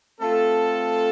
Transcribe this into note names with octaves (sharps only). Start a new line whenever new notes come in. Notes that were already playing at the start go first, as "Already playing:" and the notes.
A3 C4 F4 A4